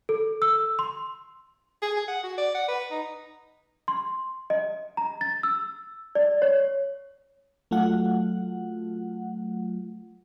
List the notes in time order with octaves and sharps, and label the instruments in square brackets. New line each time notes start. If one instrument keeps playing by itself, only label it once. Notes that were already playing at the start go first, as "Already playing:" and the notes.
[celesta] A4
E6
C6
[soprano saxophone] G#4
G#4
F#5
F#4
D5
F#5
B4
D#4
[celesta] C6
D#5
A#5
A6
E6
D5
C#5
[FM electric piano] F#3 A3 F4 F#5